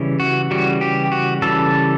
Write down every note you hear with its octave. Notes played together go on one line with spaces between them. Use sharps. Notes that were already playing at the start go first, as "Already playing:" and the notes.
Already playing: C#3 E3 G3
F#4
C#3 E3 G3 F#4
G4
F#4
C#3 E3 G3 A4